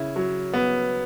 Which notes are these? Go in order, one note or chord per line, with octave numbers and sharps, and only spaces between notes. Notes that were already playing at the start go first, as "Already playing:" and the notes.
Already playing: C#3 E4
F#3
B3